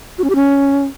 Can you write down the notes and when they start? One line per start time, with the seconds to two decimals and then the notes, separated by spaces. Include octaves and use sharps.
0.18 F#4
0.24 C#4
0.30 G4
0.35 C#4